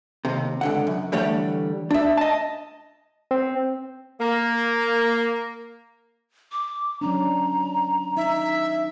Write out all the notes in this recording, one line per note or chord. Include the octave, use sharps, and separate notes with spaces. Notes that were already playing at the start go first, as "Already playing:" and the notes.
D#2 C3
C#2 D3 F#5
F#2
D3 E3 G3 A3 C#5
D4 E5
D#5 A5
C4
A#3
D6
F#3 C#4 D4 A#5
D#4 E5